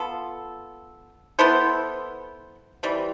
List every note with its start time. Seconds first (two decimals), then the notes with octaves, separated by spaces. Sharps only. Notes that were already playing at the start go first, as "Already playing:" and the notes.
Already playing: B3 F4 A4
1.39 B3 E4 A4 C5
2.83 E3 G3 C4